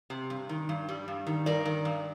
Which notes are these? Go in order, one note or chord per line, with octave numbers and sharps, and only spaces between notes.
C3
G2
D#3
G2
G3
G2
D#3
G2 A#4 D5
D#3
G2